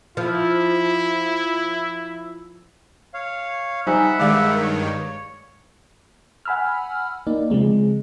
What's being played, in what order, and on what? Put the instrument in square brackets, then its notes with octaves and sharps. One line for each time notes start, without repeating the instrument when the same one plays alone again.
[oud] F3 [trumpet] E4
[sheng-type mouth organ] C#5 F5
[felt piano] G3 D#4 [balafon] C5 G#5 [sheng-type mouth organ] E5 F#5 B5
[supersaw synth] G2 D#3 [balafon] G#3 G#4 D6 [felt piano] D5 F5
[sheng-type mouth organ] C#5
[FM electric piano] F#5 G#5 B5 E6 F6
A#3 D#4 D5
C#3 F3 G#3 C4